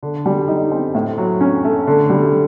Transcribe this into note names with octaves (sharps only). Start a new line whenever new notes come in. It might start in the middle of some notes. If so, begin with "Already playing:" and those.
D3
G3
D#4
C4
A2
F#3
C#4
A3
D3
G3